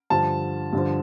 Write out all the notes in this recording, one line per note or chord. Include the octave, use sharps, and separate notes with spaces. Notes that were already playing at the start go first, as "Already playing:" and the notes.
G2 D3 F3 A5
G2 D3 F3